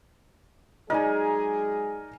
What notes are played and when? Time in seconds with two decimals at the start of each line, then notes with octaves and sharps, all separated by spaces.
0.90 F#3 G#3 D#4 G#4 A#4 D5 D#5 G#5